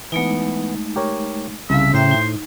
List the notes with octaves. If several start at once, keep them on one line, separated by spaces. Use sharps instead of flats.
E3 G#3 A3 B3 D#4
G4 A#4 C#5
C2 C#3 E5 F5
A2 C5 E5 G5 A#5
D#4